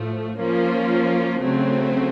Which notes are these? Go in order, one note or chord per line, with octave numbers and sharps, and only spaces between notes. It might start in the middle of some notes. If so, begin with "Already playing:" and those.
Already playing: A2 F3 A3
F3 A#3 C#4 F4
C#3 F#3 A3 C4